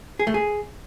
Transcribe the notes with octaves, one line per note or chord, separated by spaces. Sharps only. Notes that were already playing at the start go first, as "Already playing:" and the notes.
G#4
A3
G#4